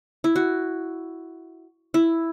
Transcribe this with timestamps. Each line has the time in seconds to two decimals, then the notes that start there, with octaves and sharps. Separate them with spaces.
0.24 E4
0.36 F#4
1.94 E4